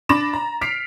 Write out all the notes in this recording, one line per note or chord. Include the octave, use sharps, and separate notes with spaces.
D4 B5 D6 A6 A#6 E7
A#5
F6 B6 C7 D7 F7